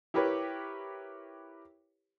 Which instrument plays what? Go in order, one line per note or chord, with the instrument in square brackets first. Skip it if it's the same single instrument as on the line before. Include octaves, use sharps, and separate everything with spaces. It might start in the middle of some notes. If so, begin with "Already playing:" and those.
[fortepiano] E4 G4 A#4 B4 C#5